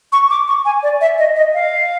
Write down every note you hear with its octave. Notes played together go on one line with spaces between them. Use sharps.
C#6
D6
C#6
G#5
D5
E5
D#5
D#5
F5